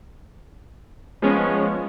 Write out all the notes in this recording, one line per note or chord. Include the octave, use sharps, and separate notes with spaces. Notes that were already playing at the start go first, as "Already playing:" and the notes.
F3 G#3 B3 C#4